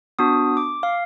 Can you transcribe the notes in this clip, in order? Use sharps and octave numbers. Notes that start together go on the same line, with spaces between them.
B3 D4 F#4 D#6
D6
F5